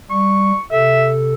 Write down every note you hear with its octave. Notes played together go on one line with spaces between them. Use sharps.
G3 C#6
C3 A4 E5